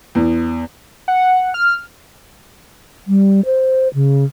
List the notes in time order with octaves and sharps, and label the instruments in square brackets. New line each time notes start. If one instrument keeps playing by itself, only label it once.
[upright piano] E2
[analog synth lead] F#5
F6
[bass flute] G3
C5
C#3